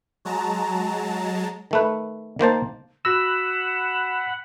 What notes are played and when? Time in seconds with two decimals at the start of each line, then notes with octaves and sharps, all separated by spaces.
0.25 F#3 G#3 A5 A#5
1.71 D#3 A3 B4
2.39 D#3 A#3 C5 A5
3.05 F#4 F#5 B5 E6 A#6 E7